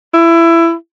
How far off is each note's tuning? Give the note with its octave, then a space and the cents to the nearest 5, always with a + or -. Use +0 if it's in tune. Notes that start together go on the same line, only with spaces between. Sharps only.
E4 +20